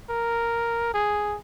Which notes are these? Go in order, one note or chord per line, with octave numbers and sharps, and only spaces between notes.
A#4
G#4